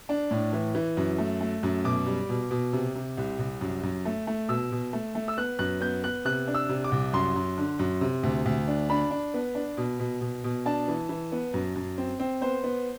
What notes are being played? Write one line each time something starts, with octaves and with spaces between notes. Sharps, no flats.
D4
A2
E3
E3
F#2
A3
A3
F#2
B2 D6
G3
B2
B2
C3
C3
C2
C2
F#2
F#2
A3
A3
B2 E6
B2
A3
A3
E6
B3 F#6
F#2 F#6
B3 G6
B3 F#6
C3 F#6
D4
E6
C3
D6
C2
F#2 C6
F#2
D3
F#2
C3
D2
D2
D4
D4 B5
D4
B3
D4
B2
B2
B2
B2
D4 A5
E3
E3
B3
F#2
F#2
C4
C4
B3 C5
B3